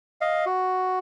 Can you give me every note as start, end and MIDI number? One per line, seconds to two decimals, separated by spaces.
0.21 0.45 75
0.21 0.45 77
0.46 0.99 66